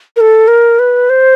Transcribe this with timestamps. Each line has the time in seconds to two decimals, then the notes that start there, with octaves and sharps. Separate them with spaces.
0.16 A#4
0.21 A4
0.48 A#4
0.79 B4
1.10 C5